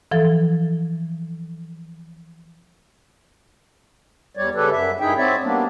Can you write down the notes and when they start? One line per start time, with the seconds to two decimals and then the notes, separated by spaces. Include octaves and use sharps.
0.11 E3 F3 A4
4.37 E2 G3 C#5 D5
4.55 C#3 G3 D4 G4 A4 B4
4.72 F#2 E5
5.00 G2 D#4 E4 G#4 E5 G5
5.17 C4 F#4 C#5 D5 E5
5.44 G3 A#3 B3 D4